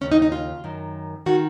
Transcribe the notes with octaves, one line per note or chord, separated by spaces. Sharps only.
D#2 C#3 C#4
D#4
D#4
F4
F#2 D#3
D#3 F#4